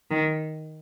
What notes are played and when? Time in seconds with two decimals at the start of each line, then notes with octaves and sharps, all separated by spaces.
0.11 D#3